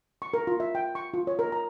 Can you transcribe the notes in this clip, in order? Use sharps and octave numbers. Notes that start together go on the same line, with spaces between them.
C#6
A#4
F4
E5
G5
C#6
F4
C#5
A#4
A#5